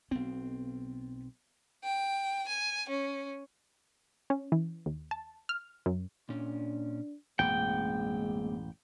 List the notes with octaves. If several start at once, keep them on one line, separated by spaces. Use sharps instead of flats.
B1 B3 C4
G5
G#5
C#4
C#4
E3
D#2
A5
F6
F#2
A#2 C#4 D4
A1 F#2 B2 G#3 A#3 C4 F#5 G5